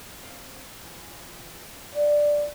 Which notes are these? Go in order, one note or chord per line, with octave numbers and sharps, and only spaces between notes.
C4 F5
E3 F3
D5 F#5